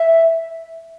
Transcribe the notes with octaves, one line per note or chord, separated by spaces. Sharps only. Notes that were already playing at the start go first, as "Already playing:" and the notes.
Already playing: E5